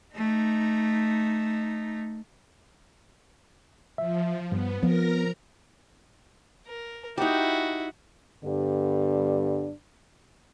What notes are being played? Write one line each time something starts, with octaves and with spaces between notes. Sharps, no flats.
A3 D#4
F3 E5
G2 B3
F3 B3 A#4 A#5
A#4
D#4 E4 F#4 G4
G2 D3 G3 B3 D4 D5